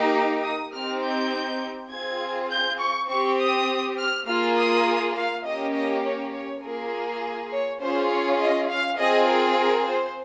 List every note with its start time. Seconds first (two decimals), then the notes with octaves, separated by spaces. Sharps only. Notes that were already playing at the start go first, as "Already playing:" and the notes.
Already playing: A#3 D#4 G4
0.44 D#6
0.73 C4 D#4 G4 F6
1.03 G6
1.91 C4 F4 G#4 G#6
2.51 G6
2.80 C#6
3.09 C4 G4 C#6
3.39 D#6
3.98 F6
4.27 A#3 F4 G#4 F6
4.57 D#6
5.16 F5
5.45 A#3 C#4 G4 D#5
5.74 D#5
6.04 C#5
6.33 C#5
6.63 A#3 F4 G#4 A#4
7.52 C#5
7.81 C#4 F4 G#4 C5
8.11 C#5
8.39 D#5
8.69 F5
8.98 C4 F4 G#4 D#5
9.28 A#4
9.57 A#4
9.88 C5